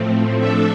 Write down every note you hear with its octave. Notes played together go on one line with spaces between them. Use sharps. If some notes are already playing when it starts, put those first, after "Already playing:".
Already playing: A2 F3 A3 C4
F3 A3 D4 A4 E5